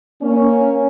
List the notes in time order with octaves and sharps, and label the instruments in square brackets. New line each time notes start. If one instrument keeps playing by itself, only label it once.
[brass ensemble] A#3 C#4